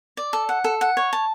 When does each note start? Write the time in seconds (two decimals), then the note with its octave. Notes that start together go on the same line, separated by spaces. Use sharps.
0.17 D5
0.33 A4
0.49 F#5
0.64 A4
0.81 F#5
0.97 C#5
1.13 A5